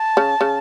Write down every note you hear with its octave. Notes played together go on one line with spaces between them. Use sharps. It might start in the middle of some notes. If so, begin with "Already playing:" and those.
Already playing: A5
C#3
C#3